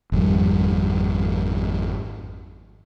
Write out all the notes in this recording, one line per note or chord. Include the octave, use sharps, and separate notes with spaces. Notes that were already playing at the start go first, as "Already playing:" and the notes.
G#1 F2 G3